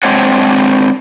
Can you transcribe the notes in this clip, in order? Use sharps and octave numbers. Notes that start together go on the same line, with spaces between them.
G#3 C4 D4 C5 C#5 F#5